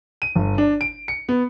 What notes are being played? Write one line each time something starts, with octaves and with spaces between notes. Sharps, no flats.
D#7
G1
D4
D7
C#7
B3